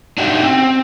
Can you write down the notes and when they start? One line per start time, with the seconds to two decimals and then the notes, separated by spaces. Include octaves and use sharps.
0.18 D4 D#4 F#4 G4 E5
0.42 C4